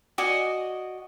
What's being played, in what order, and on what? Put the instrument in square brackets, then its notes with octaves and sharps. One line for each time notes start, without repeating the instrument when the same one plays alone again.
[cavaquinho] F#4 D5 D#5 G#5